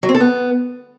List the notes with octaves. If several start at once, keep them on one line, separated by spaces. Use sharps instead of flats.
F#3
C4
A4
B3